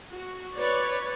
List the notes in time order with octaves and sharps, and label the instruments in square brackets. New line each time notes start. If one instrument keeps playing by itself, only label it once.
[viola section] F#4
B4 C#5 D5